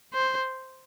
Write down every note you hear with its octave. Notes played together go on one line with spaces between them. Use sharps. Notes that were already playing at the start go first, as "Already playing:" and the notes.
C5